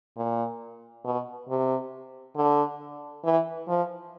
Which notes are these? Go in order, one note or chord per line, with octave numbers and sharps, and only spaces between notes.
A#2
B2
C3
D3
E3
F3